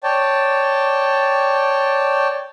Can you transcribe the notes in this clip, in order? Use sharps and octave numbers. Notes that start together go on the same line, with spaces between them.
C#5 D5 G5 A5